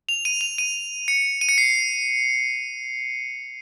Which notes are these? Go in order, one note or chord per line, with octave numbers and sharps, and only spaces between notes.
F7
D#7
F7
D#7
C#7
D#7
C#7
C7